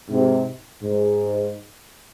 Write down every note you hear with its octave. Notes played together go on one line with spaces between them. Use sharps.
G#2 C3
G#2